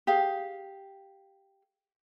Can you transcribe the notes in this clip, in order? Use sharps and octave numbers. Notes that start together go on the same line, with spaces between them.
G4 G#4 F5